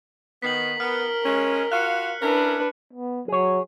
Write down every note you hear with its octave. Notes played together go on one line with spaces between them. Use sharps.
D#3 B3 B6 C7 F#7
B3 A#4 F6
G#3 C#4
F4 F#4 F5 F#6 C#7
C#4 D4 E4 A#4 B4
B3
F#3 G#4 C#5